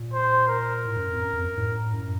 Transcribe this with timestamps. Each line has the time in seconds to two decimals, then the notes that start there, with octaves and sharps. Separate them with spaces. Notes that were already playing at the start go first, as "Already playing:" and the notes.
Already playing: A#2
0.14 C5
0.49 A#4
0.85 A2
0.97 F#2
1.10 F2
1.21 F#2
1.33 F2
1.45 F#2
1.57 A2
1.93 F#2